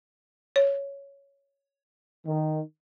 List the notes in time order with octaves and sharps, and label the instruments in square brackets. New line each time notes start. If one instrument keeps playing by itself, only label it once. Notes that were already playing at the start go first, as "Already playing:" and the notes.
[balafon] C#5
[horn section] D#3